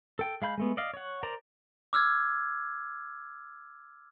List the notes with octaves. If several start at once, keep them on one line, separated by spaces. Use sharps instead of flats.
A4 G5
G#3 F5 B5 G6
G#3 A3 B3
D5 D#5 F5
C#5 F#5
A#4 C5 D5 A#5
D6 E6 F6 G#6